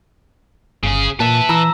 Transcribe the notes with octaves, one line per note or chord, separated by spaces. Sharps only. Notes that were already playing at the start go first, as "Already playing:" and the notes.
G1 C#3 G#4
A#2 B4 E5 A5
E3 A#5 B5 E6